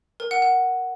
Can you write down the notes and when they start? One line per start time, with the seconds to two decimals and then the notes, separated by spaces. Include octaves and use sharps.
0.20 A#4
0.31 F#5
0.42 F#5